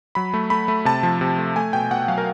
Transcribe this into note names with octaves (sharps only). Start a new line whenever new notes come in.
F#3 B5
A3
A3 B5
A3
C3 A5
F3
C3
A3
A3 G#5
B2 G5
B2 F#5
F#3 F5
A#4